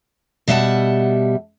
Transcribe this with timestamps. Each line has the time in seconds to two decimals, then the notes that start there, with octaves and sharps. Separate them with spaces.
0.48 B2 G3 E5 F#5 A5